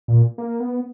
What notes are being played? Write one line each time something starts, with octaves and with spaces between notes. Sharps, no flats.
A#2
A#3
B3